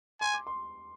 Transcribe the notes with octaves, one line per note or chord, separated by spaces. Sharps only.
G#5 C6
D6
C6